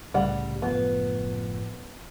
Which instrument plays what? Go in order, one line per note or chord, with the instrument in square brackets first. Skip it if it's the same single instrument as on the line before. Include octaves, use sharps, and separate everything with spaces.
[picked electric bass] C2 A2 C#3 [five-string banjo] G3 F#5
[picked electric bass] F#1 A2 F3 [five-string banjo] B3